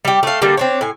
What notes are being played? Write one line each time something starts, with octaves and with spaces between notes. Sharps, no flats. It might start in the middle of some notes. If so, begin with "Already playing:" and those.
G3 G4
A3 F5
D3 G3 A#3 D4
C4 D4 C#5
A2 G#5